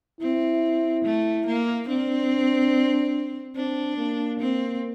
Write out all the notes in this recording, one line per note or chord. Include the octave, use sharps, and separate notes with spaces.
C4 E4
A3
A#3
C4 D4
C4 D4
A#3
C4